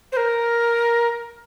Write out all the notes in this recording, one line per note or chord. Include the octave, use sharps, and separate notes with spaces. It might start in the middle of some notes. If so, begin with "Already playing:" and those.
C5
A#4